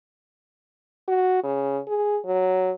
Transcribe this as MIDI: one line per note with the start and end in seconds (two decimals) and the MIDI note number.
1.08 1.42 66
1.43 1.79 49
1.87 2.18 68
2.25 2.71 54